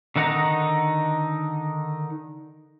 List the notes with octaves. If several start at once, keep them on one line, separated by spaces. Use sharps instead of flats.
D3 D#3 D#4 F#5 A#5